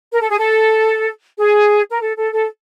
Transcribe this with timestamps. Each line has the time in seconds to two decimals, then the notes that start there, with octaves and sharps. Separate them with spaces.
0.12 A#4
0.21 A4
0.30 G#4
0.38 A4
1.38 G#4
1.90 A#4
2.01 A4
2.17 A4
2.32 A4